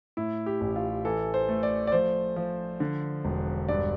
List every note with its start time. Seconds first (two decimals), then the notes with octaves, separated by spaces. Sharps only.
0.17 A2 E4
0.46 G4
0.61 A1
0.76 F4
1.05 E3 A4
1.34 C5
1.49 A3
1.63 D5
1.87 D5
1.92 F3 C5
2.36 F3
2.80 D3
3.24 E1
3.68 G2 D5